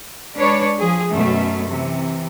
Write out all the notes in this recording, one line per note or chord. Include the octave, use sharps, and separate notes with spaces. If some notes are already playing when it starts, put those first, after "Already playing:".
G#3 D4 B4 C#5 D5
F3 G#4
F#2 B2 A3 C#4
C3 E3